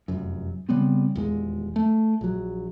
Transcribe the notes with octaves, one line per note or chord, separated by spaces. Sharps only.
F1 F#2
C#3 G3 B3 C4
D#1 E2 G#3
A3
A#1 F#3